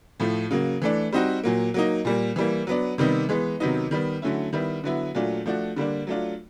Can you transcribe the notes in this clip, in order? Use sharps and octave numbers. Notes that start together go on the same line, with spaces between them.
A2 F3 A3
C#3 F#3 A#3
E3 A3 D4
G3 C4 D#4 F#4
A#2 F#3 A#3
F#3 A#3 D#4
A#2 G3 A#3
E3 G3 A#3
F#3 B3 D4
C3 D#3 G3 B3 D#4
E3 G#3 B3
C3 D#3 F#3 B3 D#4
D#3 G3 B3
D3 F#3 A3 C#4 E4
D#3 G3 B3 E4
D3 F#3 B3 E4
A#2 F#3 A3 D4 F4
F3 A3 D4 F#4
D3 G3 A#3 D4
F#3 A3 D4 F4